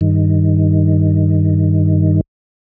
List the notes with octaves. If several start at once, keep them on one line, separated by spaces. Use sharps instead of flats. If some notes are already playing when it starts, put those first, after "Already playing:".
G2 D#3